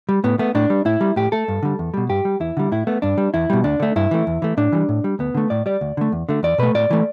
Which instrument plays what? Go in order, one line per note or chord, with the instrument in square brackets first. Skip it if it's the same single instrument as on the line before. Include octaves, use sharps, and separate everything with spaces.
[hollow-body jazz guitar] G3
A2 B3
A3 B3
A2 D4
G3
A2 E4
G3
A2 G4
A3 A4
G2
D3 G3
E2
B2 G3
G2 G4
G3
E2 E4
D3 G3
A2 E4
A3 B3
G2 D4
G3
E2 E4
B2 G3
D2 D4
D3 A3
G2 E4
E3 A3
E2
E3 A3
A2 D4
E3 G3
A2
G3
D2 B3
D3 A3
A2 D5
G3 D5
D2
D3 A3
E2
D3 A3
E2 D5
B2 A3 B4
A2 D5
E3 A3